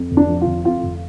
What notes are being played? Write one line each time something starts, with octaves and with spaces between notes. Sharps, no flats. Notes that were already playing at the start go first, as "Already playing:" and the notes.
Already playing: F2
F1
D4
F3
F4
F1
F2 F4
F1